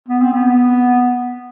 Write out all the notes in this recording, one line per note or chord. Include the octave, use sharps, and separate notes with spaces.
B3
C4
B3